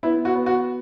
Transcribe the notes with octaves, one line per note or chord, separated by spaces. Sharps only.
B3 E4
F#4
B3
F#4